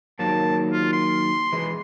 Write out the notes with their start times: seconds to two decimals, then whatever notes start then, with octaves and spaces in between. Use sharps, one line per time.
0.19 D#3 F#3 A#3 A5
0.72 F4
0.93 C6
1.53 E3 G#3 B4